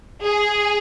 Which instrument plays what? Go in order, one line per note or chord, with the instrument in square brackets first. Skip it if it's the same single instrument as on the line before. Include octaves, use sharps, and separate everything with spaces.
[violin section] G#4